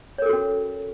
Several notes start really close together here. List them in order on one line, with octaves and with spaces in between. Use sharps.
C#5 A#4 A4 F#4 C#4